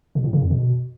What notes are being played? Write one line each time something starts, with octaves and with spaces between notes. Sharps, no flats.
B2
A2
C#3
F2
B2